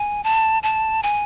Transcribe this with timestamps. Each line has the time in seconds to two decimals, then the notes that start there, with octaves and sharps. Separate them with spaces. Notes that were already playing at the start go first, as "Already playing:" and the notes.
Already playing: G#5
0.24 A5
0.63 A5
1.03 G#5